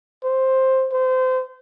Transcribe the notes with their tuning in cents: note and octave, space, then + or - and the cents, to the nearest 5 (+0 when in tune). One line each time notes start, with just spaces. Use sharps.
C5 +10
C5 -25